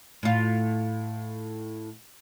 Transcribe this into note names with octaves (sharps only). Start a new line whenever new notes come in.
A2 F4